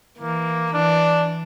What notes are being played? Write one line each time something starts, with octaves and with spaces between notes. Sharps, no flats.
E3 A#3
E3 D4